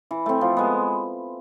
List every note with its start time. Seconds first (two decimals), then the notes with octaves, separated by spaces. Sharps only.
0.11 E3
0.26 A3 C4
0.41 F3
0.57 G#3 B3